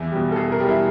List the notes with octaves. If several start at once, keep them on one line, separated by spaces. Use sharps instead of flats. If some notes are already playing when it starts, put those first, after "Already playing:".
Already playing: E2 E4
B2 G3
A4
E2 G#4
A#4
B2 G3
E4